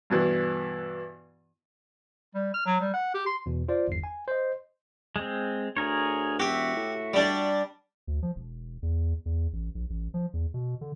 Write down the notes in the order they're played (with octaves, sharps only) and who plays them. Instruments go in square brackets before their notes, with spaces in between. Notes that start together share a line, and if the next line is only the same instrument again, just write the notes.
[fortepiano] G2 B2 E3
[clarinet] G3
F6
F#3
G3
F#5
G4
C6
[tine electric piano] E2 B2
F4 C5 D5
G1 E2 C7
G#5
C5 D#5
[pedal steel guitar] G#3 C4
[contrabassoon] D2 [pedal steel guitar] G#4 A#4 C#5
[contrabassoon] E1 [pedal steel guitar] F#4 E5 [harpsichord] G4
[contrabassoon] A2
[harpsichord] G3 D4
[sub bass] D2
F3
E1
E2
E2
A1
A#1
A1
F3
E2
B2
D3